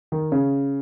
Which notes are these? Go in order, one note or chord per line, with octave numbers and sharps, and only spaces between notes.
D#3
C#3